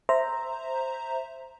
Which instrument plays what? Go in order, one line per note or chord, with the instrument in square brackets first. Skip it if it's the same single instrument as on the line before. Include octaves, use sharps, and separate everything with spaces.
[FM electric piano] C5 E5 A#5